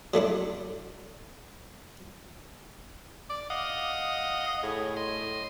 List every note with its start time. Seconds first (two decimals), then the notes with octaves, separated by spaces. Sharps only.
0.14 F#3 A3 D4 E4
3.30 D5
3.50 D#5 F5 F#5 D#6
4.63 A2 G#4
4.97 D#5 C6